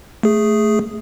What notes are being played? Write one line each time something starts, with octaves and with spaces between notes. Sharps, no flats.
A3 G#4